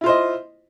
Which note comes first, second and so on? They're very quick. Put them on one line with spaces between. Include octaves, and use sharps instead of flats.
E4 F4 C5 D#5